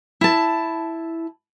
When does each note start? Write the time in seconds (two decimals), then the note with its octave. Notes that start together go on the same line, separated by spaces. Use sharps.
0.21 E4 A5